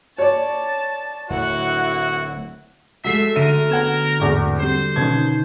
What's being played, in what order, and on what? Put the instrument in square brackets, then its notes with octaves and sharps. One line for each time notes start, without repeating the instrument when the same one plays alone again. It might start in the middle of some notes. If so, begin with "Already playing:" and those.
[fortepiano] C#5 D5 [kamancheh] A5
[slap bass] D1 [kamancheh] E4 F#5 [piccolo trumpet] F#4
[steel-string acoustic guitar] G#3 A3 F#4 [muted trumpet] E5 [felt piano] B6 C7
[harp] D3 [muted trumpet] A#4 [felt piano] E5 D#7
[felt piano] B3 F#5 [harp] G#6 E7
[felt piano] G#1 E2 A2
[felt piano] G3 C4 [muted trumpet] C5
[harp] B2 D#3 [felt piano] C#4 G#6